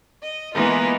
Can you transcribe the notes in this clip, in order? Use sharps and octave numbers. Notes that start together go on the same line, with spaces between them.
D#5
E3 G#3 A#3 B3 D#4 F4